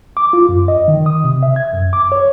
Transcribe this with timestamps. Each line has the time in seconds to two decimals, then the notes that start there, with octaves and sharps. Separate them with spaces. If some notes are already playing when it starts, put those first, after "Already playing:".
0.17 D6
0.33 F4
0.49 F#2
0.68 D#5
0.88 D#3
1.06 D#6
1.24 C3
1.43 E5
1.56 G#6
1.73 F#2
1.93 D6
2.12 C#5